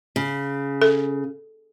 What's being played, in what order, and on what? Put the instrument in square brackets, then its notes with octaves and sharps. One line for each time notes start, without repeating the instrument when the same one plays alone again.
[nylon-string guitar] C#3
[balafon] A4